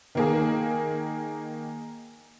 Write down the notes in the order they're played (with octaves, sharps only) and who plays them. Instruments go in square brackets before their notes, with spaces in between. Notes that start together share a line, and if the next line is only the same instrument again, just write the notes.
[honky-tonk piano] D#3 A#3 G#4